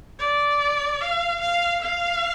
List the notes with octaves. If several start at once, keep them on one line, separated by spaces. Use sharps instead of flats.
D5
F5
F5
F5